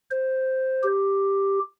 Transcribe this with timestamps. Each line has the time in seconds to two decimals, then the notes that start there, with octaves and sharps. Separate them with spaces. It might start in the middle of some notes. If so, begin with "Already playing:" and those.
0.11 C5
0.83 G4